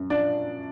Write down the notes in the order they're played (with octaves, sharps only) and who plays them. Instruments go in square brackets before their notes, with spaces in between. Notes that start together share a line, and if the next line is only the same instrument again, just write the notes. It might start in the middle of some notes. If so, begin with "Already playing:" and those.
Already playing: [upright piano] F#2
F3 D4 D5